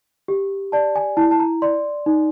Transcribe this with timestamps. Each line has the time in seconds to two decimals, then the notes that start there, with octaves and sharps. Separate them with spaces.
0.28 G4
0.72 D5 A5
0.96 G#5
1.17 E4 A5
1.31 A5
1.40 A#5
1.62 D5 C6
2.06 D#4